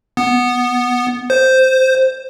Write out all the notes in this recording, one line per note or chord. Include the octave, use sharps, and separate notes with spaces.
B3
C5